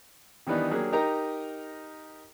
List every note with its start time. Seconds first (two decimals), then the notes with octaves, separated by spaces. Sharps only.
0.47 D#3 E3 G3 B3 D4 D#4
0.71 F#3 A#3 D4 G4 G#4
0.93 D#4 G4 A#4 D#5 A#5